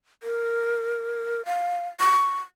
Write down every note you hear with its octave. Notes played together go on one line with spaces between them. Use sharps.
A#4
F5
C#6